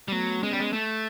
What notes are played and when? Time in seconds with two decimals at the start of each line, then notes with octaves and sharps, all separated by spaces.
0.08 G3
0.12 F#3 A3 B3
0.42 G#3 B3 C#4
0.51 G3
0.60 G#3
0.73 A3